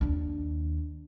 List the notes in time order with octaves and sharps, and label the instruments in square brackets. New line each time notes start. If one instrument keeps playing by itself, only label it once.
[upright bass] D#2 D4